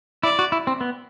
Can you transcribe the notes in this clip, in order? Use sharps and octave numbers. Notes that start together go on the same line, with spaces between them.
E4 D5
F#4
E4
C4
B3